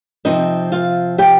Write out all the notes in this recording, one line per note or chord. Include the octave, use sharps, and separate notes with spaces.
C3 F3 C4 D#4 D#5
F4 F5
G4 G5